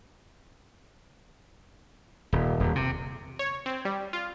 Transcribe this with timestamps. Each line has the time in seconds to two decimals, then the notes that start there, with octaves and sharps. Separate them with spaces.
2.33 D#1
2.60 D#1
2.75 C3
3.39 C#5
3.66 C4
3.85 G3
4.13 F4